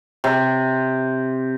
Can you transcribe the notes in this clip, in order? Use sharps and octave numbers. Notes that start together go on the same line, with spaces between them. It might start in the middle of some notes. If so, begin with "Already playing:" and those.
C3